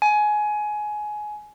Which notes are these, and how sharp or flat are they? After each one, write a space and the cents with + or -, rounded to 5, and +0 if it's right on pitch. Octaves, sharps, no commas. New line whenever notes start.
G#5 +20